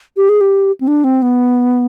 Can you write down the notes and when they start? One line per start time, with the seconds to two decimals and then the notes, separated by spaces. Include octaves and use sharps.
0.17 G4
0.29 G#4
0.41 G4
0.81 C4
0.88 D4
1.04 C4
1.22 B3